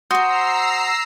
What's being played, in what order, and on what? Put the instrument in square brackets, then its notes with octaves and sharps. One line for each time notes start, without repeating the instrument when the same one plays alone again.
[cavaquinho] F#4 C5 [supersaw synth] A#5 E6 C7 [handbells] C6 D#6 G6